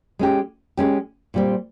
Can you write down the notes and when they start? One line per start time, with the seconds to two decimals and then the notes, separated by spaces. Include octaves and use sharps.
0.19 G#3 C#4 G4
0.77 G#3 C#4 G4
1.34 A#2 G3 C4